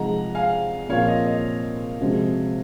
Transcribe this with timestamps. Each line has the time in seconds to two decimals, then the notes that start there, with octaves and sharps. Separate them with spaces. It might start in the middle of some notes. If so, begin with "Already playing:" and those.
Already playing: C3 F3 G#3 D#4 G#4 F#5 A#5
0.35 F5 G#5
0.89 A#2 F3 C4 F4 A#4 C#5 F5
1.08 D#5
1.26 D#5
2.00 C3 F3 G#3 C4 F#4